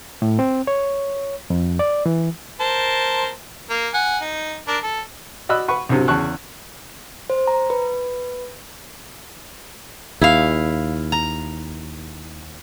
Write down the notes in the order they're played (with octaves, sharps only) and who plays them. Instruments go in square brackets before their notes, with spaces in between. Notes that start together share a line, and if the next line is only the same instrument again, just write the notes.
[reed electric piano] A2
C4
C#5
F2
D5
E3
[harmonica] A#4 C5 A5
A#3
F#5 G#5
D#4
D4 A#4
A4
[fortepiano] F#4 D5 D#5 B5 E6 F#6
B4 F#5 C#6
C2 G2 C3 F#3
E2 C#3 A5 C#6 F#6
[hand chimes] C5
A#5
B4
[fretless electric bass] D#2 [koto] E4 F5
[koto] A#5